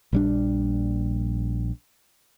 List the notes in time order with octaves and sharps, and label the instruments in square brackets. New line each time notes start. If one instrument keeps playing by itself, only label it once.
[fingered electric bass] A#1 G3 D4